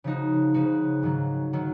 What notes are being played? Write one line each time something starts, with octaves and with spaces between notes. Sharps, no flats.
C#3 F3 G#3 D#4 F#4
C#3 F3 G#3 D#4 F#4
G#2 D#3 F#3
D#3 F#3